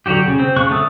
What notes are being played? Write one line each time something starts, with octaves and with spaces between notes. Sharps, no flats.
D3 F#3 F#4 G4
C#3
C4
C#3 C#6 F#6
D3 A3 A5 D#6 E6